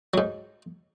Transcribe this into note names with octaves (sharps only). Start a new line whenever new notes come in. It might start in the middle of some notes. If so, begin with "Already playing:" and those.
G#2 F#3